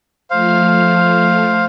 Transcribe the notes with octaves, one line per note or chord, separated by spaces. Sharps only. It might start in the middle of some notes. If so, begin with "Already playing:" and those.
F3 A3 C5 F5 F6